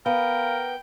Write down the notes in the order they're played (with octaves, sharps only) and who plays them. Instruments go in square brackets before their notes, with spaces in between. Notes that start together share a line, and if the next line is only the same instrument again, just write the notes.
[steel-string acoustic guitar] B3 [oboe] A#4 [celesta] F5 [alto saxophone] G5